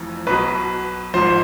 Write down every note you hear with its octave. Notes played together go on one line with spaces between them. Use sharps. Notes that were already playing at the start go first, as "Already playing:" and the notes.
Already playing: F1 F2 E3
B1 B2 B4
G#1 G#2 F3 C5